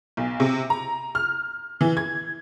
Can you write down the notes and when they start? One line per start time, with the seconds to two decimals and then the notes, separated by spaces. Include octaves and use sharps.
0.17 B1
0.40 C3
0.70 A#5
1.15 F6
1.81 E3
1.97 G#6